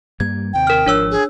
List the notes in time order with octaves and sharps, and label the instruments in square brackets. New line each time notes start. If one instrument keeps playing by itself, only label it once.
[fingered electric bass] G2 G3 A#3 [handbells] G#6
[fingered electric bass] D#2 C3 [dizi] G5
[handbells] A#4 F6
[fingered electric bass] G#1 F3 [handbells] D4 C#5 E6
[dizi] G#4